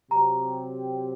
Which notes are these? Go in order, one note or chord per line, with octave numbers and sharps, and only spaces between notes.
C3 F#3 C4 G4 A#5